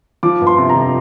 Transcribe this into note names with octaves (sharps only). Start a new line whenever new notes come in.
F3 D6
G1
C6
C3
A#5
F2